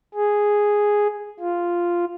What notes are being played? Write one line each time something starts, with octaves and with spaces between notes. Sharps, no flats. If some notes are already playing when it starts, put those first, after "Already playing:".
G#4
F4